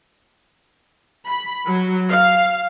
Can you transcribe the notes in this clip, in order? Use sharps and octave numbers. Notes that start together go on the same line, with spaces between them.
B5
F#3
F5